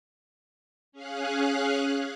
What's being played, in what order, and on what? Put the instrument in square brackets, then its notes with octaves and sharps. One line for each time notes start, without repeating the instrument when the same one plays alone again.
[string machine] C#4 G#4 F5 F#6